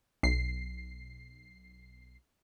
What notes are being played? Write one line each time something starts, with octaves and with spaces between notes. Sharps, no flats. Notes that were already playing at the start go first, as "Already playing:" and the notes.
B1 C7